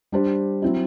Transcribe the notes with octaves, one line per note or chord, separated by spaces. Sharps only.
G3 D4 G4 C5
F#3 C4 E4